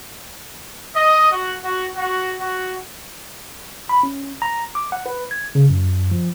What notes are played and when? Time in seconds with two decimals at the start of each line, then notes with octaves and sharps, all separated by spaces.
0.95 D#5
1.31 F#4
1.64 F#4
1.95 F#4
2.40 F#4
3.89 B5
4.03 C#4
4.42 A#5
4.75 D6
4.92 F#5
5.06 B4
5.31 G#6
5.55 C#3
5.70 F#2
6.11 F3